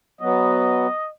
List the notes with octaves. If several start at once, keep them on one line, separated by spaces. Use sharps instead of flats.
F#3 B3 D#5